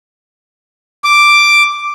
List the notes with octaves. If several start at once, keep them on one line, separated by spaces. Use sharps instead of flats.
D6